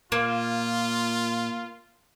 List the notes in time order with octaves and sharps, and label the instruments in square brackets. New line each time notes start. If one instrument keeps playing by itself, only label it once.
[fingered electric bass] A#2 [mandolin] A#3 [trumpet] F4